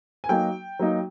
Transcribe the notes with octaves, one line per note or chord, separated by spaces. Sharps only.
G#5
F#3 A#3 D#4 G5
F#3 A#3 D#4